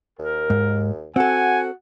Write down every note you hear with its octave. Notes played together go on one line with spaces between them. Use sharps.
D#2 A#4
G#2
C4 F#4 A4 F#5 G#5